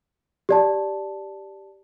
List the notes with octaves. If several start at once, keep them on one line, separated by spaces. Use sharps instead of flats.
G4 D5 A5